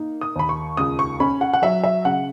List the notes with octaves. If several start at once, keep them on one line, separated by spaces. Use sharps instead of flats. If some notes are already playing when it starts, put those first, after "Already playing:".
Already playing: A#3 D#4
D#6
D#2 B5
C#6
C#2 D#6
C#6
C#4 B5
F#5
F#5
F#3 E5
E5
C#3 F#5